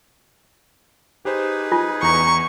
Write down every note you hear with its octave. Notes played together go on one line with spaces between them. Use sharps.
D#4 G4 G#4 B4 C5
F4 G#5
E2 A#5 C#6